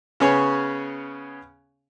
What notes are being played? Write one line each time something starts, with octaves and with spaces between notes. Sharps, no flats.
C#3 B3 C#4 G#4 C#5 C#6